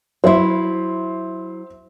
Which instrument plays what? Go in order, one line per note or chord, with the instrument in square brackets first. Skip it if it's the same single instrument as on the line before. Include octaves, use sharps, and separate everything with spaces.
[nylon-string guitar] F#3 E4 [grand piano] C5 E5 C6